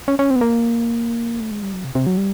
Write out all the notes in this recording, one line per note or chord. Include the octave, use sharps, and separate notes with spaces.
C#4
C#4
C4
B3
A#3
A3
G#3
G3
F#3
C3
C3
F#3
G3